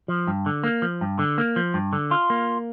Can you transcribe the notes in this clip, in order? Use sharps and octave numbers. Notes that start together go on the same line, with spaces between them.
F3
G2
D3
A#3
F3
G2
D3
A#3
F3
G2
D3
F4
A#3